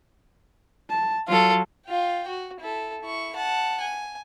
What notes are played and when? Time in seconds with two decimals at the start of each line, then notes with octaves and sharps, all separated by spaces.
0.90 A5
1.28 F#3 F4 A4
1.86 F4 G5
2.27 F#4
2.60 E4 A4
3.01 E4 C#6
3.36 F#5 A5
3.81 G#5